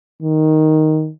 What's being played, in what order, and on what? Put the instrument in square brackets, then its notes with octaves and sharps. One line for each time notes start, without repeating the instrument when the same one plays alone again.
[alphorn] D#3